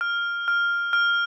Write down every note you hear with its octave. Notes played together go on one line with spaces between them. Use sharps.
F6
F6
F6